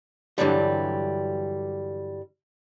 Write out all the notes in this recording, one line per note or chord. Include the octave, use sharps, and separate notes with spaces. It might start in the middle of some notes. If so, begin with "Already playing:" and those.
G2 B2 D3 E3 F#3 G3